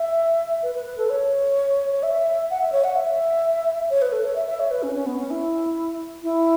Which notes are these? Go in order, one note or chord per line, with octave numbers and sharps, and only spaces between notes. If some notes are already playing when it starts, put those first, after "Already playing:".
Already playing: E5
B4
B4
B4
A4
C#5
C#5
E5
F#5
E5
C#5
F#5
E5
C#5
B4
A4
C#5
E5
E5
C#5
B4
C#4
C#4
B3
C#4
E4
E4